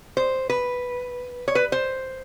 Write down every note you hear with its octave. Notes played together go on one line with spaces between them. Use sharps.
C5
B4
C#5
B4
C5